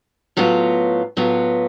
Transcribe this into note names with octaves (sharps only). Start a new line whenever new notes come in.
A2 F#3 B3 F4
A2 F#3 B3 F4